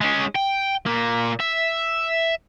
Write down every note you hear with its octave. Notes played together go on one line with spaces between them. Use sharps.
G#3 C#4
G5
A#2 A#3
E5